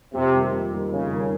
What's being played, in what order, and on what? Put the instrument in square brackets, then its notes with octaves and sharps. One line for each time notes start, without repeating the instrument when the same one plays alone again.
[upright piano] F2 [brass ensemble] C3
[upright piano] D#3 G3 A#3 D#4
F2
D#3 G3 A#3 D#4
[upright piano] F2 [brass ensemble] C#3
[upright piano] D#3 G3 A#3 D#4